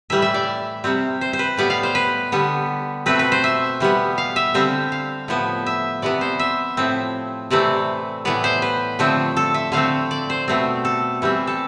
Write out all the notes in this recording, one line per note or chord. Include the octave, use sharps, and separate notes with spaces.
A2 E3 G3 E5
E5
D5
C3 G3 C4
C5
C5
B4
A2 G3 B3 D5
F5
C5
B4
D3 G3 B3
B2 A3 C4 B4
B4
C5
E5
E3 G3 B3
F5
E5
D3 G3 C4 F5
F5
A2 F3 B3
E5
C3 E3 B3 D5
C5
E5
A2 F3 C4
C3 E3 A3 C4 D5
A2 E3 B3 D5
C5
B4
D3 F3 A3 C4
A4
E5
D3 A3 C4 F5
D5
C5
B2 A3 C4
A4
E3 G3 C4
A4